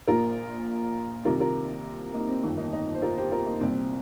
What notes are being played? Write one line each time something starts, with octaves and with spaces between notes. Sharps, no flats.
A#1 A#2 F4 A#4
C2 C3 D#3 F4 A#4
F4 A#4
A#3 D#4
C4
G1 F2 D#3 C4
A#3 D#4
A#3 D#4
C5
F4 A#4
G4 C5
F4 A#4
A#3 D#4
C2 A#2 C4